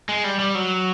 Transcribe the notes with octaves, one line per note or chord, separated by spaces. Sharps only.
G#3
G3
G3
F#3